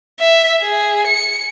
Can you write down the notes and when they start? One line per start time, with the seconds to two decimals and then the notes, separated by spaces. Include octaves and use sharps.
0.20 E5
0.61 G#4
1.07 C#7